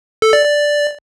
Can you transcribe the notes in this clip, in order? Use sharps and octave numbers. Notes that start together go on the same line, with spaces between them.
A4
D5
D5